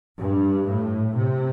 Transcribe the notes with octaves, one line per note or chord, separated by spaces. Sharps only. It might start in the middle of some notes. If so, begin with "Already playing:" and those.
G2
A2
C3